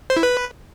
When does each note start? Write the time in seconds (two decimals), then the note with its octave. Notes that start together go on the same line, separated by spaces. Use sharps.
0.10 C5
0.17 E4
0.23 B4